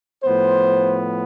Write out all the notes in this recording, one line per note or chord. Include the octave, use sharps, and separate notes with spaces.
A2 F3 B3 C5